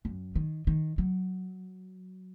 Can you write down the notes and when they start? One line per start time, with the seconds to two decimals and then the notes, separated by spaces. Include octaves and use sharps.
0.05 F#2
0.35 D#3
0.67 D#3
0.98 F#3